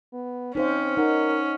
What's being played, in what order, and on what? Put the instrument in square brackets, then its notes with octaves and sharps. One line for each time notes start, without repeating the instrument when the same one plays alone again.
[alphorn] B3
[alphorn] C4 [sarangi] C#4 [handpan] D#4 C5 F5
[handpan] D#4 F#5 [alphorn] A#4